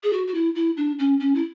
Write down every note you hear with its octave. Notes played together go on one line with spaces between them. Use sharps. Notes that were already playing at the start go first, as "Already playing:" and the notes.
G#4
F#4
F#4
E4
E4
D4
C#4
C#4
E4